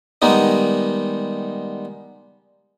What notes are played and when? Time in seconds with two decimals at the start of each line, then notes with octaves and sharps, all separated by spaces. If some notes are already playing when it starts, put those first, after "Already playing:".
0.22 D#3 G3 G#3 B3 D#4